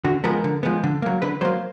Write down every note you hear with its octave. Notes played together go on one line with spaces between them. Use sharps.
D3 F#4
F3 G#3 B3 A#4
D3
F3 G#3 B3
D3
F#3 A#3
D3 B4
F#3 A#3 C5